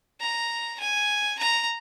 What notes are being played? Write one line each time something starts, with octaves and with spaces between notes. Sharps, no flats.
A#5
G#5
A#5